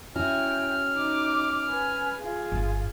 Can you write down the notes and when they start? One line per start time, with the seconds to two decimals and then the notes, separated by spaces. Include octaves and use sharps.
0.16 C#4 E4 F#4 G5 F6
0.93 D#4 D6
1.68 B4 G#5
2.19 F4 G#4
2.52 G1